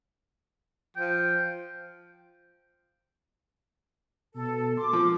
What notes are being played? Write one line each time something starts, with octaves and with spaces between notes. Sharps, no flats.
F3 G5
B2 A4
C6 D6
F3